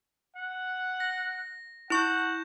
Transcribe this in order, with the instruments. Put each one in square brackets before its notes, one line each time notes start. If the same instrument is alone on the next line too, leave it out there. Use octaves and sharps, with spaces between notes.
[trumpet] F#5
[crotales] A#6
[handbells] E4 C#6 [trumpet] F#5 [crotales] G6 E7